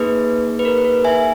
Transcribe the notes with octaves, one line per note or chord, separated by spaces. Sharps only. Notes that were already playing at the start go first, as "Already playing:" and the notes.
Already playing: A#3 D#4 G#4 B4
B4
A#4
B4
A#4
E5 G#5